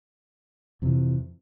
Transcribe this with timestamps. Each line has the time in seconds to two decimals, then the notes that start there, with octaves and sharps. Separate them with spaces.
0.82 F2 C3 E3